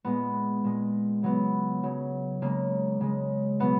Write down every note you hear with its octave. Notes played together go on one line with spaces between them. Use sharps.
A#2 G#3 B3
A#2 G#3
C#3 F#3 B3
C#3 F#3
C#3 G#3 A#3
C#3 G#3
B2 F#3 B3